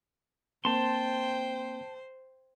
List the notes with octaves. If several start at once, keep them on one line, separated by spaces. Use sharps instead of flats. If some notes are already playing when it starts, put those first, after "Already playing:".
A#3 C4 C5 G5 A5 C6